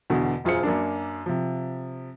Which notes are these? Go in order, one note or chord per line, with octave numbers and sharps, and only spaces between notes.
E2 B2 D3
E1 F#2 F4 G#4 C5 C#7
F#2 A#3 D4
C3 F3